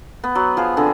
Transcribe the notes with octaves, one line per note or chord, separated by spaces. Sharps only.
B3
F#3
F3 G#4
D3 C4 G#4